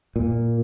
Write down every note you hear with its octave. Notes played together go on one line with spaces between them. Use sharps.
A#2